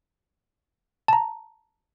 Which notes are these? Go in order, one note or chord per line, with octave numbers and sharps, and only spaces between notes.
A5 A#5